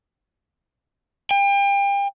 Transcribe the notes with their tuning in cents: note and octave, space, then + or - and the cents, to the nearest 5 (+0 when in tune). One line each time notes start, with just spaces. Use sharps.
G5 +35